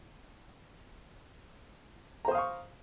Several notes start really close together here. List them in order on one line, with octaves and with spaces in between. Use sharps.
A#5 C5 D#6 F5 C#6